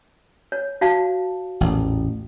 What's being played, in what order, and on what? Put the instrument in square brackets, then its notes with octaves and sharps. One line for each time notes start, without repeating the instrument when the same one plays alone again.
[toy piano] C#5
F#4 F5 A5
[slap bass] A1 E2 A#2